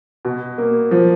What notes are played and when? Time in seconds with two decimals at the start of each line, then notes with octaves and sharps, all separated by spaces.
0.25 B2
0.58 A#3
0.91 F3